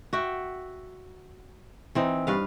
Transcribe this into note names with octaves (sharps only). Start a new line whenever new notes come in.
F#4 E5 G5
E3 C4 D#4
G2 B4 F5